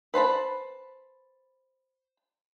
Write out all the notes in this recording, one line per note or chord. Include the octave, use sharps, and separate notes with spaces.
B4 C5 A5 B5